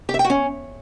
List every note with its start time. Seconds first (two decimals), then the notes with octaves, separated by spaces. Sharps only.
0.09 G4
0.14 E5
0.19 G5
0.24 F#4
0.30 C#4